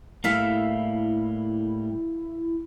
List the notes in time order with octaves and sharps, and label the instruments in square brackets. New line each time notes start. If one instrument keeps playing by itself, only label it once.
[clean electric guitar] A2 G3 A#3 [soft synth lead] E4 [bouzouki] A4 E5 F5